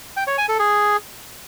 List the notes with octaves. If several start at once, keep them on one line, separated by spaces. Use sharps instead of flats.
G5
C#5
G#5
A4
G#4